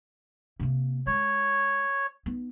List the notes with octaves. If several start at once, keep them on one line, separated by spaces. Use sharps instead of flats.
C3 A#3
G#3 C#5
B3 D#4